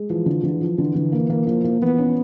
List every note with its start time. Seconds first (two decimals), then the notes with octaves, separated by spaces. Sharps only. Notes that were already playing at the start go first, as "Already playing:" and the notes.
Already playing: G#3
0.10 E3 F3
0.26 D3
0.43 D3 E3
0.61 F3
0.77 D3 E3
0.95 D3
1.12 A#3
1.30 A#3
1.47 F3 A#3
1.64 A#3
1.81 E3 B3
1.98 C#4